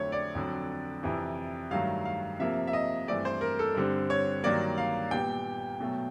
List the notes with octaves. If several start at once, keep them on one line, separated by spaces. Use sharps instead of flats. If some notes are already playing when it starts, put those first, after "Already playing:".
Already playing: F2 D3 F#3 A3 C4 C#5
D5
F2 D3 F#3
F2 C3 E3
G2 D#3 F#3 A3 F5
F5
C3 F3 A#3 E5
E5
D#5
G2 E3 A3 C4 D5
C5
A#4
A4
G2 D3 G3 C4
C#5
G2 D#3 F#3 A#3 D5
F5
A#2 G3 B3 G5
B2 F#3 A3